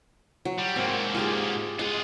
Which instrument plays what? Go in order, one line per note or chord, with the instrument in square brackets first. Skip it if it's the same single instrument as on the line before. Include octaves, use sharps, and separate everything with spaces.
[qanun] F#3
[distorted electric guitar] G3
[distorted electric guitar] G#2 A#3 [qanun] C4
[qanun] F4 G4 G#4
[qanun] G#3 F#5 [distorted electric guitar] F4 G#4